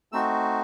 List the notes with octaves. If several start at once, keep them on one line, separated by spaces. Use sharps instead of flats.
A3 C4 D#4 F#4 E6